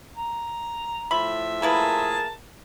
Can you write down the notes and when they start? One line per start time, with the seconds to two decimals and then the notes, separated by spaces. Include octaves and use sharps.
0.16 A#5
1.11 A2 F3 E5 B5
1.62 A#3 E4 G#4 A#4 B4 A5